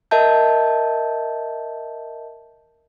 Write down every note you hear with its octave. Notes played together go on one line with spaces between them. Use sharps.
A#4 D#5 E5 A5 G6